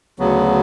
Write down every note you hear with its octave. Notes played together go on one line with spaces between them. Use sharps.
D2 C#3 F#3 B3